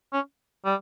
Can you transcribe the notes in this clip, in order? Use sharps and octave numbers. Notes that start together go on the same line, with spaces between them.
C#4
G3